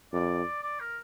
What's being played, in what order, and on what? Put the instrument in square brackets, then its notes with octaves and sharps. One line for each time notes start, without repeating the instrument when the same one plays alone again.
[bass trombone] F2 [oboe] D5
[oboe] D5
A#4